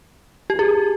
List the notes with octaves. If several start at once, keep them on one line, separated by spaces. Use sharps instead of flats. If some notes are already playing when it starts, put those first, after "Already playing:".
G4
G#4